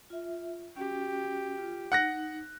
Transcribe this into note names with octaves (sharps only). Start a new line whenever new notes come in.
F4 E5
C#4 F#4 G4
F4
D#4 F#5 F#6 A#6